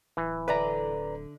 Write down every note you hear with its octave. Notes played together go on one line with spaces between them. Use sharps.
D1 E3
D3 B4 D5 E5 A#5